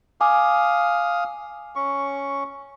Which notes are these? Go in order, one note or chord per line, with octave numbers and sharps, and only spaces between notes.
F5 G#5 D6 D#6
C#4 C#6